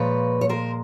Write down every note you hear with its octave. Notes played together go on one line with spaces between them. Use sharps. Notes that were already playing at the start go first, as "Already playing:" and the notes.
Already playing: A#2 F3 G#3 B4 C#5
C#5
A#4 C5